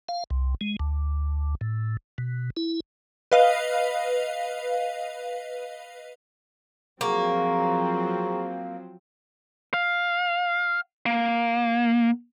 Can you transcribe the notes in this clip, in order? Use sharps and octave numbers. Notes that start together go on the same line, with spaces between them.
F5
C2
G#3
D2
A2
B2
E4
B4 D#5 F5
F3 F#3 A#3 C4 G#4 A#5 C#6
F5
A#3